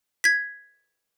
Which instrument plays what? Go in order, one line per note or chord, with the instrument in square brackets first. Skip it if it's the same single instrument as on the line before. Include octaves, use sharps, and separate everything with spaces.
[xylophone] G#6 B6